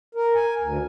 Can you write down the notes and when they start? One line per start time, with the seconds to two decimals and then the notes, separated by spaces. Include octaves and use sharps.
0.15 A#4
0.35 G#5
0.60 D2